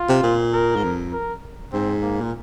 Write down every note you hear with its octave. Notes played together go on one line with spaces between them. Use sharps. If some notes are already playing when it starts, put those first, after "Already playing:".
Already playing: F4
C3
A#2
A#4
G#2
F2
A#4
G#2 C4
A#3
A#2